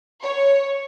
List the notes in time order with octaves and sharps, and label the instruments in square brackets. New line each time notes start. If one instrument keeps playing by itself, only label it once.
[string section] C#5